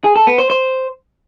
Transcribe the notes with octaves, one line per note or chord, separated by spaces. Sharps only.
G#4
A4
B3
C5
C5